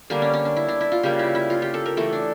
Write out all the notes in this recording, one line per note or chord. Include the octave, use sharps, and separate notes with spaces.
D3 G3 A#3 D4
C#4
C#4
D4
E4
D4
E4
F4
C#3 G3 A#3 G4
E4
E4
F4
G4
A4
A#4
E3 A3 A4
D4